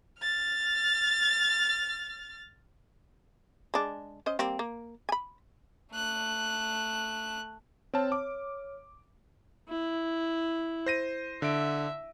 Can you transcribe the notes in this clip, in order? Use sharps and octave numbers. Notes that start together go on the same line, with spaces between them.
F6 A6
G#3 D4
C#4 C5 D#5
G3 A#3 C4
A#3
G#5 B5
A3 F#6
C4 C#5 A5 F6
D6
E4
C5 A#6 D#7
D3 E5 D7